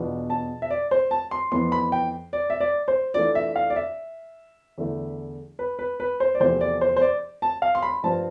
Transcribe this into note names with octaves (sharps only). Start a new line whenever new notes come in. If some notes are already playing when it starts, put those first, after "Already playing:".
Already playing: E2 B2 B3 D4 F4
A5
E5
D5
C5
A5
C6
F2 E3 B3 C6
B5
G5
D5
E5
D5
C5
E3 A3 D4 F4 D5
E5
F5
D5
E5
E2 D3 A3 E4
B4
B4
B4
C5
D5
E2 C3 F3 A3 C5
D5
C5
C5
D5
A5
F5
C6
B5
G2 F3 C4 F4 A5